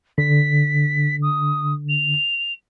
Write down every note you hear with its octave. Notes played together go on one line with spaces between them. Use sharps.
D3 B6
D#6
F7